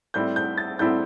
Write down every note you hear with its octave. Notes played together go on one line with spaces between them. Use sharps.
A2 G3 C4 E4 G6
G6
A6
A2 G3 C4 E4 G6